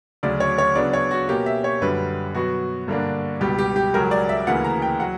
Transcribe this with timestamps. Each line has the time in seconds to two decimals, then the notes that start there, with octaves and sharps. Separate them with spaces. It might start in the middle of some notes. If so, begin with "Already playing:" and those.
0.23 D2 C#3 F#3 D5
0.40 C#5
0.58 C#5
0.75 C#3 F#3 B3 D4 D5
0.93 C#5
1.11 F#4
1.29 B2 A#3 C#4 G4
1.46 E5
1.64 C#5
1.82 F#2 D3 G3 B4
2.35 B2 F#3 B3 F#4
2.88 G2 D3 A#3 D4
3.40 C#2 B2 G3 G4
3.58 G4
3.76 G4
3.94 C#2 C#3 F#3 C#4 A#4
4.11 D5
4.29 E5
4.47 D2 C#3 E3 A#3 F#5
4.64 A#5
4.82 G5
5.00 F#3 F#5